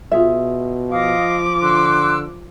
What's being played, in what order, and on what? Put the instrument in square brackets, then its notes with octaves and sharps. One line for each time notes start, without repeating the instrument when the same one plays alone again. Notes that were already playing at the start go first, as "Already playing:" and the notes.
[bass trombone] B2 [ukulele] F4 G#4 E5
[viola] F3 D6 [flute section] D#5 F5 D#6
[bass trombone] D3 [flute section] C6 E6 F#6